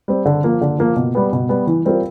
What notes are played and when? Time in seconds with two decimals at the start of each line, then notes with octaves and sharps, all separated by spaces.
0.08 G3 C4
0.25 D3
0.44 F3 A#3
0.61 D3
0.78 F3 A#3
0.96 B2
1.15 G3 B3
1.33 B2
1.49 G3 B3
1.67 E3
1.85 G3 C4 F4 A#4